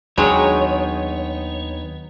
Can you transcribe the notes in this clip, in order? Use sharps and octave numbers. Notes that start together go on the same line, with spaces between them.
D#2 F#3 G#3 B3 D4 D#4 C#5 G5